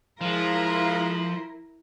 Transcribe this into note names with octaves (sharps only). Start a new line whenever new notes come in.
F3 G#3 E4 F4 A#4